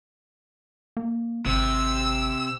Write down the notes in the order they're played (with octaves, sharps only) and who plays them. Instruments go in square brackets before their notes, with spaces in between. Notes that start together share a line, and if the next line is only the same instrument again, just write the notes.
[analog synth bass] A#3
[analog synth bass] G#1 [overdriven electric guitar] C3 [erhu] E6